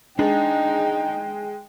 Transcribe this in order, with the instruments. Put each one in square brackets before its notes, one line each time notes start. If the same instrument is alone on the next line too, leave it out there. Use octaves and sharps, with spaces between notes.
[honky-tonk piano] G#3 [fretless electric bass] D4 [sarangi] D#4 [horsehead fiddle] G5